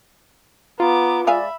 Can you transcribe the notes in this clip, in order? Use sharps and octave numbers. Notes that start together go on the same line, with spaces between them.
B3 F4 A#5 D6
G#3 D5 E5 F5 G#5 B5